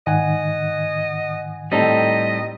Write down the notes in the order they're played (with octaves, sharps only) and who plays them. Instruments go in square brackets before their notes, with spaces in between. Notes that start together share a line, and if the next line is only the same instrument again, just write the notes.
[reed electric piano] G#2 D#3 [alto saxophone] D#5 [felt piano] F#5 G#5
[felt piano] A2 C4 [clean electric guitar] G3 D#4 A4 [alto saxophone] D#5